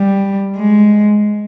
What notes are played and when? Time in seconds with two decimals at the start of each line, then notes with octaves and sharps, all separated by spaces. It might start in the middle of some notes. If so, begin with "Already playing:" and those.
Already playing: G3
0.56 G#3